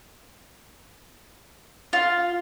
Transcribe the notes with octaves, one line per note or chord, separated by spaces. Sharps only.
F4